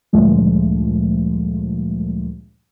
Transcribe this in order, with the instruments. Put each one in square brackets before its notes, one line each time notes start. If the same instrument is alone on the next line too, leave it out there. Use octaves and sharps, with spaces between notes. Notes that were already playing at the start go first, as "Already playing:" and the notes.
[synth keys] D2 G2 A#2 F3 G#3 A3